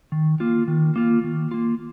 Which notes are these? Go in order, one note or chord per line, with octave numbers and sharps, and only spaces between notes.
D#3
A#3 F4
D#3
A#3 F4
D#3
A#3 F4